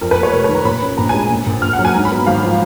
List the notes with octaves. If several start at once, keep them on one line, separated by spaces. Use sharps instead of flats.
F2 A#4
B4
A#3
C#5
F1 A#4
B4
D#3
A#5
A#2 B5
C#4
A#1 A#5
G#5
G#3
A#2
A#1
A#1 F6
F#5
F#3
G#5
G#2 A#5
B5
B3
G#1 F5
F3